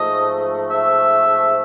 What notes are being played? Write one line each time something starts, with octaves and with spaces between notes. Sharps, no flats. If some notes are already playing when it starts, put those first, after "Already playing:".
Already playing: G#2 F3 A3 D#5
E5